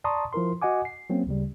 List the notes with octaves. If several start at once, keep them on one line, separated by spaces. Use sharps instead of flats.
D5 A5 A#5 C6 C#6 D#6
F3 E4 A#4 C6
F#4 D#5 F#5 G#5 D6
C7
F#3 A#3 C4 C#4
D2 C#3 G3